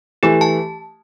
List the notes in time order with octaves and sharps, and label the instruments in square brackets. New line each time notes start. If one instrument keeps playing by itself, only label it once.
[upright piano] E3 A3 [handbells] G4
[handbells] A5